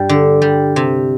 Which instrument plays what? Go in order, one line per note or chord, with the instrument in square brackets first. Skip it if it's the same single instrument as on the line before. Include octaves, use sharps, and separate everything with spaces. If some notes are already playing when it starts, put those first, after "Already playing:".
Already playing: [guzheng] G2 G3
D3
G3
C3